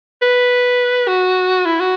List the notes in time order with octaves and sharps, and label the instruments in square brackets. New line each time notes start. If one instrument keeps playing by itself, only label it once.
[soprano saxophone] B4
F#4
E4
F#4